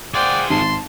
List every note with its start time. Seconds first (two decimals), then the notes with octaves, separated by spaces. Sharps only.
0.14 F4 G#4 C5 D5 F#5 G5
0.50 G#1 A5 C6